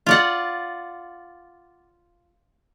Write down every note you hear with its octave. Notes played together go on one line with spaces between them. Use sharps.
F4 D5 F#5